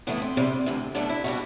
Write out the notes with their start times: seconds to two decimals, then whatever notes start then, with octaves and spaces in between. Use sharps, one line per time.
0.07 A2 E3 A3 B3
0.22 C4
0.36 E2 C3 G3
0.66 D2 C3 E3
0.95 B2 F#3 A3 D4
1.09 E4
1.24 B2 G3 F#4